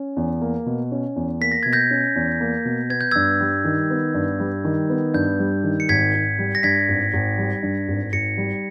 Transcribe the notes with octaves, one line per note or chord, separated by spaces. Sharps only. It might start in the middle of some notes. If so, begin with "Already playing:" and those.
Already playing: C#4
E2
A#3
B2
C#4
E2
A#3 B6
A#6
B2 G#6
G6 A#6
C#4
E2
A#3
B2
B3 G#6
G6
G2 E6 G#6
G3
D#3
B3
G2
G3
D#3
B3
G2 G6
G3
D#3
C#7
G#1 G#6 B6
G#1
G3
A#6
G2 G#6 B6
G#1
G#1
G3
G2
G#1
G#1 A#6 C#7
G3